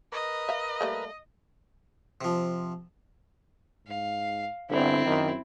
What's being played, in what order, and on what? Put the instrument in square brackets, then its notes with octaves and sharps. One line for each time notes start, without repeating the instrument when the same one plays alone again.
[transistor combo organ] A#4 B4 [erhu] D#5
[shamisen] E5 F5
G3 A3 A#3
[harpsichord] C3 F3
[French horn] G#2 [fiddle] F5
[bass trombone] G1 [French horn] D3 [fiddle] C4 E4
[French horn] F#2 [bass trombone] D#3